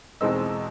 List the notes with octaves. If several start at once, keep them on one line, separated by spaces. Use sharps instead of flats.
E2 B2 G#3 C4 D#4 E6